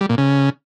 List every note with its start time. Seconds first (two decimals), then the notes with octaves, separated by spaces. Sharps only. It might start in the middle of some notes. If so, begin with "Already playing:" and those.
0.01 G3
0.09 A#2
0.18 C#3